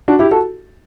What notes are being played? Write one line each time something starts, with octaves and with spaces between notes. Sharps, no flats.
D4 F#4
E4 G4
F#4 A4